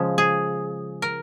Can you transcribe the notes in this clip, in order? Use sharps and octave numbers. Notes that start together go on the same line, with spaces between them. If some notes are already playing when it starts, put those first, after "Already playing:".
Already playing: C#3 F3 G#3
G#4
A#4